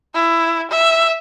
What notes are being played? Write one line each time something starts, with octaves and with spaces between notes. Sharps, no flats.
E4
E5